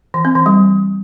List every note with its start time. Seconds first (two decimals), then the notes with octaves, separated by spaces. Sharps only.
0.14 E3
0.25 C4
0.35 E3
0.46 G3